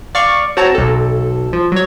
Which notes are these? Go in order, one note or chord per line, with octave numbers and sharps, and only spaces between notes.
D5 F5 C#6
C4 F#4 C#5 A5 A#5
B1 A4
F3
F#3 C#5